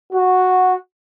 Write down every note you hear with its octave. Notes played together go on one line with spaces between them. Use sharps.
F#4